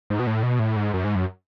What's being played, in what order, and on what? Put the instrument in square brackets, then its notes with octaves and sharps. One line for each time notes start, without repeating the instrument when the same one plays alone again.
[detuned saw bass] G#2
B2
A2
B2
A2
G#2
F#2
G#2
F#2